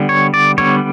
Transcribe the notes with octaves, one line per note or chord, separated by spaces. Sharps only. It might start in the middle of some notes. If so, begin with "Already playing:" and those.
Already playing: D3 G3 B3
C#5
D5
D3 G3 B3 C#5